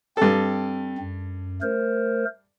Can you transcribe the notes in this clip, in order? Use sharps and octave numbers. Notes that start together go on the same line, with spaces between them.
G2 C4 A4
F#2
A3 A#4 C5